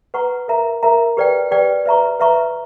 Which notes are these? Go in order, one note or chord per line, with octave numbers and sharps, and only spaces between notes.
B4 F#5 A#5 C#6
A#4 E5 A#5
A#4 E5 A#5
G4 B4 D5 G5
G4 B4 D5 G5
B4 E5 A#5 C#6
B4 E5 A#5 C#6